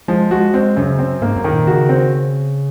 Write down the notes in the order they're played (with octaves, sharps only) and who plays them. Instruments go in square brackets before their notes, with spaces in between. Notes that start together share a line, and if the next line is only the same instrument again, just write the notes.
[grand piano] F3 [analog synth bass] G#3
[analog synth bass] G#3 [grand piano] F#4
[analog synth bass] G#3 [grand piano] C4
[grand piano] F#2 [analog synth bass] C#3
[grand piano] C4
[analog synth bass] G#2 [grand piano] A#3
[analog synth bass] F#2
[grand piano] D#3
[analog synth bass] A#2
[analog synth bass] C#3 [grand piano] F#4
[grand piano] C4